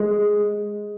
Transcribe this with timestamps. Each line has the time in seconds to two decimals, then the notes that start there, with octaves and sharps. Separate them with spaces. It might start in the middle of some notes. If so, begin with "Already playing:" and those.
Already playing: G#3